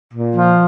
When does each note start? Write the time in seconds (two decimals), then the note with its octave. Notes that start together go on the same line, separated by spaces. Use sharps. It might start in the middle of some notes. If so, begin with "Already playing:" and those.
0.13 A#2
0.35 F3